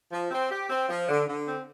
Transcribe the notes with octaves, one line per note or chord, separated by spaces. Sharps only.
F3
C4
G4
C4
F3
D3
D3
C4